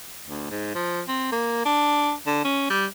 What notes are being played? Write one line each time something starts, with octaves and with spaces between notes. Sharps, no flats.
D2
G#2
F3
C4
A#3
D4
D3
C#4
G3